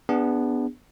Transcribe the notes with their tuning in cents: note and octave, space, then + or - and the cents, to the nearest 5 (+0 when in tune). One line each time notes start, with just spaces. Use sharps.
B3 +0 D4 +0 G#4 -35